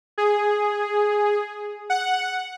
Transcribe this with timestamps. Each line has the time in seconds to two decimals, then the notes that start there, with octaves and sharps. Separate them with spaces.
0.18 G#4
1.90 F#5